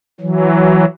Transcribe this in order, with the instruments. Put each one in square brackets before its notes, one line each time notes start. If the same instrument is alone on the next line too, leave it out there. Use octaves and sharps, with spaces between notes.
[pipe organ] E3 F#3